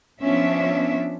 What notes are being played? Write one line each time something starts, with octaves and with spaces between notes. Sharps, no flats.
F3 B3 C#4 D4 E5